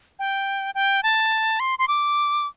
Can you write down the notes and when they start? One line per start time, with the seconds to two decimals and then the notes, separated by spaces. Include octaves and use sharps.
0.19 G5
0.75 G5
1.03 A5
1.60 C6
1.79 C6
1.88 D6